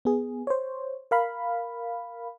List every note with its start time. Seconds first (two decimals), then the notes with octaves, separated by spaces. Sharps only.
0.05 B3 G#4
0.47 C5 C#5
1.11 A#4 F5 B5